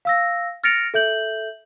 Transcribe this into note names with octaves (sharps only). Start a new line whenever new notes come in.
F5 E6 A#6
F6 A6 A#6 C#7 D7 F7
A4 E5 G6 F#7